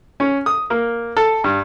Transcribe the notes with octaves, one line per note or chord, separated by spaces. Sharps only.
C#4
D#6
A#3
A4
G2